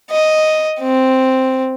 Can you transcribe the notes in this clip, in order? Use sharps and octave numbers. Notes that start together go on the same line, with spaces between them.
D#5
C4